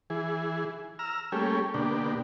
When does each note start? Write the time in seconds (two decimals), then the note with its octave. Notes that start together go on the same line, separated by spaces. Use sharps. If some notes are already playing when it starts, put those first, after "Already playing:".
0.10 E3 G#4
0.99 A#5 E6 F6
1.32 G3 A3 A#3 C#4 G4 G#4
1.74 B2 D3 A#3 D4 G4